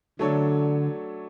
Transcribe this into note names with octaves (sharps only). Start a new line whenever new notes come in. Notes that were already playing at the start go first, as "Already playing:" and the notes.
D3 F#3 A3 D4 A4 C#5